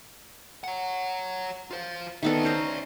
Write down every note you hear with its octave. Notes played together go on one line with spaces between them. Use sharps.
C#5 F#5
F4 C5
D#3 B3 A4 D5 E5
C#4 C5 A#5